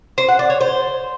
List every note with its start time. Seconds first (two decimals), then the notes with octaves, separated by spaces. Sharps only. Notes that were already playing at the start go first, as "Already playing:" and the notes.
0.18 C5
0.28 F#5
0.39 D5
0.50 C#5
0.61 C5